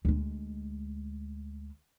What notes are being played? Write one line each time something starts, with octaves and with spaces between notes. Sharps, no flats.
D2 G#3